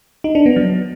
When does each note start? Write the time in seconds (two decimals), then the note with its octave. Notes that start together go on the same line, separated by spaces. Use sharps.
0.24 D#4
0.35 D4
0.46 B3
0.56 F#3